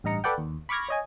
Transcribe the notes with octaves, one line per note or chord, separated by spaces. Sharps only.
A1 G2 D#5 A#5 C#7
A4 B4 D5 F#5 G5
D#2
B5 C#6 D6 F6 G#6 A#6
C#5 D#5 G#5